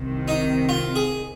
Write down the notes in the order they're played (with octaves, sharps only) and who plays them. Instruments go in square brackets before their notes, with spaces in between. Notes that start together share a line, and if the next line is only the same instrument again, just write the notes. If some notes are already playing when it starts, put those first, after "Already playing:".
Already playing: [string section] C2 C3 D#3
[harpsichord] D#4
F4
G#4